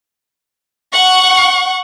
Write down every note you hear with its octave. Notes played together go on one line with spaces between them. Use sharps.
F#5 C#6